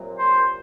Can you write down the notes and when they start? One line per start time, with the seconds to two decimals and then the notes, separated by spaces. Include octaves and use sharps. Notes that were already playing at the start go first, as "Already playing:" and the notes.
Already playing: C2 A#2 F#3
0.19 C5 C6